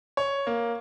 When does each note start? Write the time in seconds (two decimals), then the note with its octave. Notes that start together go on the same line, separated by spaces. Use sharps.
0.17 C#5
0.47 A#3